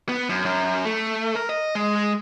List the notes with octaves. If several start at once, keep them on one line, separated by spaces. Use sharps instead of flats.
B3
F#2
F#2
A3
A#4
D#5
G#3